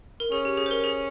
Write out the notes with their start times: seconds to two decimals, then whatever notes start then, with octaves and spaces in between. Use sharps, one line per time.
0.20 A#4
0.31 C#4 G#4
0.45 G4
0.57 G#4
0.66 C5
0.71 A#4
0.84 G#4